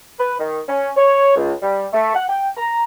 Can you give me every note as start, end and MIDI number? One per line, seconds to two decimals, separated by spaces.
0.19 0.34 71
0.39 0.59 51
0.67 0.90 61
0.96 1.33 73
1.36 1.53 37
1.62 1.86 55
1.93 2.14 57
2.15 2.23 78
2.29 2.48 79
2.57 2.83 82